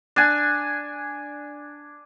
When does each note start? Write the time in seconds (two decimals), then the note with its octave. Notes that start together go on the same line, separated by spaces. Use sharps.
0.16 D4 G#5